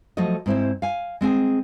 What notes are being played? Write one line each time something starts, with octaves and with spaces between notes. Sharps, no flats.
F3 F#3 A3 A4 D#5
G#2 C4 E4 C5
F5 G#5
G#3 C4 G#4 G#5